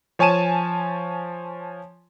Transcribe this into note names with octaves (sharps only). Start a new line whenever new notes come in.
F3 C#5 G#5 A5 D#7 E7